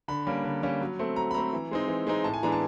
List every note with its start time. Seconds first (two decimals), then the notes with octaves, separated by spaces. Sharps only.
0.08 D3 B5
0.27 G3 A#3 C#4
0.44 D3
0.63 G3 A#3 C#4
0.81 F#3
0.99 A3 C4
1.16 F#3 A#5
1.31 B5
1.34 A3 C4 A#5
1.53 E3
1.71 G#3 C4 D#4
1.88 E3
2.07 G#3 C4 D#4
2.24 A2 A5
2.34 G#5
2.43 E3 G#3 B3 D4 A#5
2.52 A5